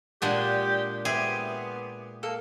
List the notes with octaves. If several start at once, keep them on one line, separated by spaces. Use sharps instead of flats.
A#2 G#3 D4 G4 F#5
B3 G4 G#4 C5 E5
A#3 A4